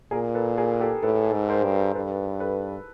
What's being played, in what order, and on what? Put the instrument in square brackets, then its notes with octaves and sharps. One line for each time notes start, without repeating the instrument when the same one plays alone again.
[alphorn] A#2 [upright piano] G#4 A#4
[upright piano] A4 B4
G#4 A#4
G4 A4
[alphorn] A2 [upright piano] A4 B4
[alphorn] G#2
[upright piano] A#4 C5
[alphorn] G2
[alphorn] G2 [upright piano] A4 B4
[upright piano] A4 B4